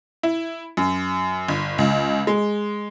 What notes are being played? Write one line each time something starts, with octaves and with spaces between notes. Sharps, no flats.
E4
F#2
G1
C#2
G#3